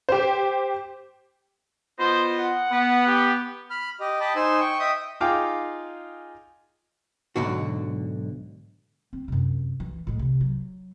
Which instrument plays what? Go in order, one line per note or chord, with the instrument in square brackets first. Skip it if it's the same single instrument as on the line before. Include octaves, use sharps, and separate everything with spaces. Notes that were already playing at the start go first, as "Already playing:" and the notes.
[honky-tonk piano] G4 C5
[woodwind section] B3 F4 D#5 [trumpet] C5
[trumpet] F#5
[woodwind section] B3
[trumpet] G4
[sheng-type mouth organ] B5 F6
G4 D#5
D#5 G5 A5 B5
D#4 C5 G#5 E6
G5 C#6
D#5 E5 G5 D#6
[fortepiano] D#4 F4 G#4 F5 G5 D6
[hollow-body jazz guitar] B1 G#2 D3 F#4
[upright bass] C4
F#2 C3
E3
A2 G#3
C3
F#3